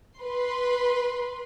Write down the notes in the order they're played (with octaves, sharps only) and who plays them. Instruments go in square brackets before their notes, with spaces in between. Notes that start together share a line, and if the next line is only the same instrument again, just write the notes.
[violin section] B4 C6